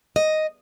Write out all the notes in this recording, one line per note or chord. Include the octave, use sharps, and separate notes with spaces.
D#5